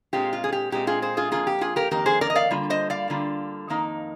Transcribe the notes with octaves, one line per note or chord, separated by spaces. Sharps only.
A#2 G#3 C4 F4 G4
F4
G#4
G4
A#2 G#3 C4 F4 G4
F4 G#4
G#4 C5
F4 G#4
F2 D#3 A#3 F4 G#4
G4
F4 G#4
G4 A#4
F2 D#3 A#3 G4 A#4
G#4 C5
A#4 D5
D#5
D5 F5
D3 G3 A#3 F4
C5 D#5
D5 F5
D3 G3 A#3 F4
F2 D#3 A#3 D#4